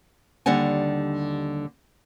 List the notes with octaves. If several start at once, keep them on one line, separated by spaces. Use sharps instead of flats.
D#2 D3 G3 F#5 G#5